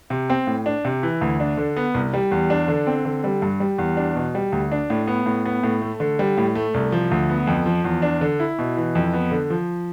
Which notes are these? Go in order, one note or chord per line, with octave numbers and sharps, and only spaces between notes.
C3
C4
A2
D4
C3
E3
D2
D4
D3
B3
C2
G3
E2
D4
D3
C4
D3
G3
G2
G3
E2
D4
B2
G3
D2
D4
A2
B3
A2
B3
A2
A3
D3
G3
A2
A3
C2
F3
D2
B3
F2
F3
E2
D4
D3
E4
B2
E3
F2
B3
D3
F3